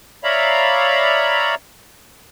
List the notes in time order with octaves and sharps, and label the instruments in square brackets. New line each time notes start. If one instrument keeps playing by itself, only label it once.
[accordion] C#5 D5 E5 F5 A#5 B5